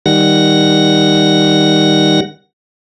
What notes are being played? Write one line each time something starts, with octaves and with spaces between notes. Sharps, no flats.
D#3 G3 F#5 A#6